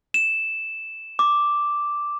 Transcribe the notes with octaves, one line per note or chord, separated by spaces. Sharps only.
E7
D6